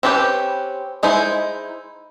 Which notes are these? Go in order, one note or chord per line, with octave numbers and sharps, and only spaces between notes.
C4 C#4 E4 G4 B4
G#3 D#4 E4 C5